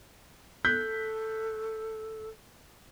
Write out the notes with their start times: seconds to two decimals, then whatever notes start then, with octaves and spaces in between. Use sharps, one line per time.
0.65 A4 F#6 G6 B6